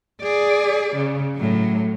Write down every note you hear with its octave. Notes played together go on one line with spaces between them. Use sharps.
G#4 D5
C#3
A2 F#3